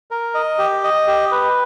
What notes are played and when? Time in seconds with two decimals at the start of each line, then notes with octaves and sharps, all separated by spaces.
0.11 A#4
0.35 D#5
0.59 G4
0.84 D#5
1.07 G4
1.32 B4